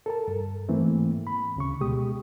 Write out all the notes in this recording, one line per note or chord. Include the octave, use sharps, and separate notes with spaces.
A4 A#4 A5
G2
G#2 E3 A3 A#3 C4
B5
D2 C#3 C#6
B2 G#3 G4 D#6